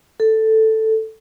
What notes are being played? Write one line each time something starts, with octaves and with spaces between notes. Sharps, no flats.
A4